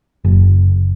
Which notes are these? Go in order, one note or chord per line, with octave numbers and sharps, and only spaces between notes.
F#1